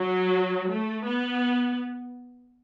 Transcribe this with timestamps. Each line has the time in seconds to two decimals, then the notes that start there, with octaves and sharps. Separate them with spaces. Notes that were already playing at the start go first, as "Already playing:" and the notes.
Already playing: F#3
0.69 A3
1.06 B3